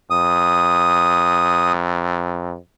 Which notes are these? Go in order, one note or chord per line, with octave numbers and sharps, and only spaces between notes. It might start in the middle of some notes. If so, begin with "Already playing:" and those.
F2 D#6